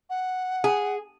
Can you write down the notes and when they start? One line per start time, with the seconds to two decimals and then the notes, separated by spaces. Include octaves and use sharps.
0.10 F#5
0.64 G#4